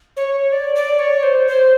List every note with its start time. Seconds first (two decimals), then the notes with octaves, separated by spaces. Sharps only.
0.17 C#5
0.52 D5
0.75 D5
0.99 C#5
1.23 C5
1.47 C5